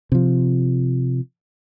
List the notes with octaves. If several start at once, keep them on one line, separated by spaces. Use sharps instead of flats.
C3 F3